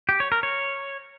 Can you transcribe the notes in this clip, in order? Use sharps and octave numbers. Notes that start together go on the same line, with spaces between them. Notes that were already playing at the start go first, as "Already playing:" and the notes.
G4
C#5
A#4
C#5